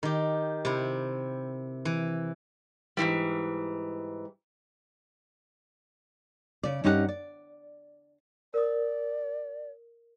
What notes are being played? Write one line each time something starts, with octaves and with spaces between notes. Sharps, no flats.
D#3 G4
C3 E4
E3
G#2 C3 E3 G3
C#3 D5
G2 C#4 D#4 G4 B4 F#5
D5
A#4 D5 D#6